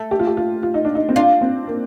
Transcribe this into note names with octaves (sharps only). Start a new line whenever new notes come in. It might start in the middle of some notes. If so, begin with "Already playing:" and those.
Already playing: A3
G4
F4
G4
F4
F4
D#4
D4
D#4
C4
D4 F4
C4
A#3